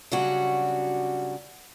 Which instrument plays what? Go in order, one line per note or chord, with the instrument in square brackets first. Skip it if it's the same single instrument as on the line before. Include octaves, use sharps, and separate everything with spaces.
[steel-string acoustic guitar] C#3 F#3 G3 D4 F#4